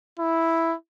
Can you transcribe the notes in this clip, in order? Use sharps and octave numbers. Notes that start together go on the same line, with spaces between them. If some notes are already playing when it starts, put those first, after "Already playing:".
E4